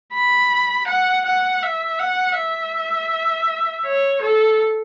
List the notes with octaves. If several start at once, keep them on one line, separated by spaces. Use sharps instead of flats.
B5
F#5
F#5
E5
F#5
E5
C#5
A4